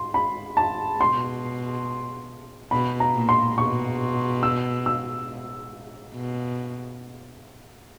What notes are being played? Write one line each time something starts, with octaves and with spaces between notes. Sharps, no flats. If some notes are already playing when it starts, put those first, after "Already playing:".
Already playing: C6
B5
A5
B2 C6
B2 B5
A#5
A#2
C6
B2 C#6
E6
E6
B2